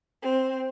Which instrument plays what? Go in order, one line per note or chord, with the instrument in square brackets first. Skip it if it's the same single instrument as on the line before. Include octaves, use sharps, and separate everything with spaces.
[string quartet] C4